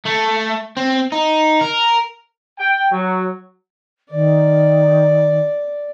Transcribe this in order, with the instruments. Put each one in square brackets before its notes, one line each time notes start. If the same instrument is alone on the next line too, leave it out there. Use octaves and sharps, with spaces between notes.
[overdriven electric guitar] A3
C4
D#4
A#4
[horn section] G5
F#3
[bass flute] D#3 [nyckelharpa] D5